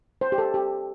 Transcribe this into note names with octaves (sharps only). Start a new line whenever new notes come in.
C5
G4
A4
G4